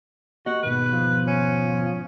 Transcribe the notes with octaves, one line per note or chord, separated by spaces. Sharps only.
A#3 F#4 G4 D#5
D#2 G#2 B2 B4
F3
C#4